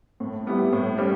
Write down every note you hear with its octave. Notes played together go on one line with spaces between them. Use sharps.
A2
G3 B3 E4 G4
A2
G3 C#4 G4